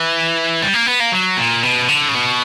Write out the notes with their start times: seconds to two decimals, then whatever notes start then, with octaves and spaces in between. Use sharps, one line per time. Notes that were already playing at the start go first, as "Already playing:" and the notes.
Already playing: E3
0.62 G3
0.74 A#3
0.87 B3
1.00 A#3
1.13 F#3
1.37 A#2
1.63 B2
1.88 D3
2.09 C#3
2.15 B2